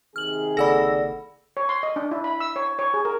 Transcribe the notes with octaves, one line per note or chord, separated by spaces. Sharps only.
C3 D#3 G#4 F6 F#7
F#1 A4 D5 F#5 B5 E6 A#6
C#5
C6
D#5
D4
E4
B5
E6
C#5
C#5
G#4
A#4